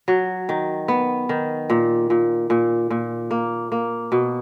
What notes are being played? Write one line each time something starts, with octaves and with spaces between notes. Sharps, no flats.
F#3
D#3
B3
D#3
A#2
A#2
A#2
A#2
A#3
A#3
B2